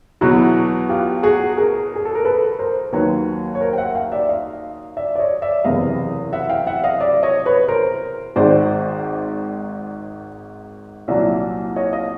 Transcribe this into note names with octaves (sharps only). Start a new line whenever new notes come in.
E2 B2 F#3 E4 F#4
F4 G4
F#4 G#4
G#4 A#4
G#4
A4
A#4
A4 B4
A#4 C5
D#2 D#3 F#3 B4 C#5
C#5
A#4 C5
G5
E5 F#5
F5 G5
D5 E5
D#5 F5
D5 E5
D5
C#5 D#5
D5 E5
F#1 E2 C3 E3 D#5 F5
E5 F#5
F5 G5
E5 F#5
D#5 F5
D5 E5
C#5 D#5
B4 C#5
A#4 C5
G#1 G#2 D#3 C5 D5
C2 A#2 F#3 D5 E5
C#5 D#5
D#5 F5